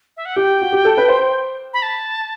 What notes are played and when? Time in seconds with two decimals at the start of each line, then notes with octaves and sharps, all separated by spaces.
0.17 E5
0.25 F#5
0.36 G4 G5
0.61 F#4
0.72 G4
0.85 A4
0.97 B4
1.08 C5
1.73 B5
1.82 A5